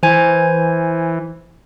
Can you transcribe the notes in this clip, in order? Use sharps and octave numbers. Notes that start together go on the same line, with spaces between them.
E3 C5 G#5 G#6